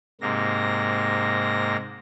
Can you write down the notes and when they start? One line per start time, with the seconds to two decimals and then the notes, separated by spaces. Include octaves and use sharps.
0.21 G#2 C3 A#3 A#6